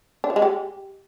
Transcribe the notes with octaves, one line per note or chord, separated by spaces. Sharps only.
D4
F3
G#3
G4